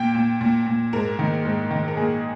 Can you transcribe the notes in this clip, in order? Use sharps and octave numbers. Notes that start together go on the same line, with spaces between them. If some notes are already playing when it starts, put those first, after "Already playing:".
Already playing: A#2 G5
A#2
A#2
A#2
G#2 A#4
D#3
G#2
D#3
A#4
A#2 G#4